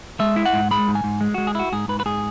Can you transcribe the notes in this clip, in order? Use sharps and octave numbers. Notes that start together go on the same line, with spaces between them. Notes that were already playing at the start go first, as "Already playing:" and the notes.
G#3 E5
E4
F#5
G#2
G#3 B5
G#2
G#5
G#2
G#3
G#3 F#4
G#4
E4 F#4
G#2 G#4
G#2 B4
B4
G#2 G#4